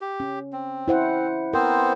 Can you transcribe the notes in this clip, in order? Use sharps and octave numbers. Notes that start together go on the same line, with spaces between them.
G4
C#4
C4
E4 C5 F#5
B3 C4 A#4 C5